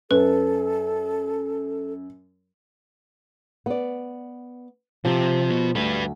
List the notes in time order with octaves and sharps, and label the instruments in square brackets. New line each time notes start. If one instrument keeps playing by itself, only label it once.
[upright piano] F#2 [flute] A4 [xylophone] B4
[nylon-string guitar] B3 D5
[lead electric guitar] C3 [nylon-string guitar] F3 G4
[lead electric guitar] B2 B3
[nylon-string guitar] D2 [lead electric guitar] G3 B4